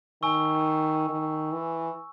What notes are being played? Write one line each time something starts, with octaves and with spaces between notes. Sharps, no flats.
D#3 G#5 C#6 E6
D#3
E3